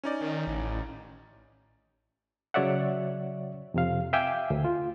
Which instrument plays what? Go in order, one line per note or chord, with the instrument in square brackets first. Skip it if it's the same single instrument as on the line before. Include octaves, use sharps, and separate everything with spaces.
[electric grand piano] C#4 D#4 D5
[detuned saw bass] D#3
A1
[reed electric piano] C#3 F#3 C#5 D5 E5 F#5
F2 C3 F5
E5 F5 G5 G#5 D6
D2
F4